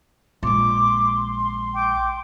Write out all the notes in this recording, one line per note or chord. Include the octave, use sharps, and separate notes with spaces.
A#1 G#3 C6 D6
G5 D6